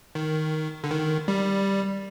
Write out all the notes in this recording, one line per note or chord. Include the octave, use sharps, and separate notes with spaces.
D#3
D3
D#3
G3